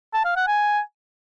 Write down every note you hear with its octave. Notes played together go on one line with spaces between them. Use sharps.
A5
F5
F#5
G#5